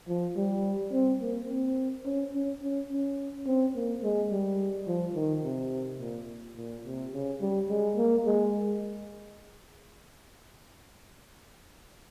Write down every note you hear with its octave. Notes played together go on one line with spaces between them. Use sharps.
F3
G3
C4
A#3
C4
C#4
C#4
C#4
C#4
C4
A#3
G#3
G3
F3
D#3
C3
A#2
A#2
C3
C#3
G3
G#3
A#3
G#3